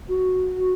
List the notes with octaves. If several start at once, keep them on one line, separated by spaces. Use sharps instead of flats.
F#4